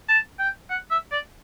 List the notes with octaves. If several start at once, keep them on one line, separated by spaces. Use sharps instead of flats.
A5
G5
F#5
E5
D5